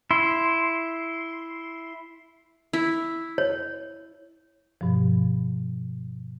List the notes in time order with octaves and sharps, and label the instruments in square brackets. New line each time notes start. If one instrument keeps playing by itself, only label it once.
[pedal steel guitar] E4 C6
[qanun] E4
[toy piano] C#5
[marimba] G2 B2 F3